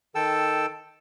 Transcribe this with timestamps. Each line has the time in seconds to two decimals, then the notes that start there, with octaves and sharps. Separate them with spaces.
0.15 D#3 A4 G5 A5 E6